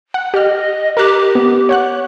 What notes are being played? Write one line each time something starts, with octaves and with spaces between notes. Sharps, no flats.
F#5
G4 D#5 F6
G4 A#4 F#6
B3
C#5 F#5 F#6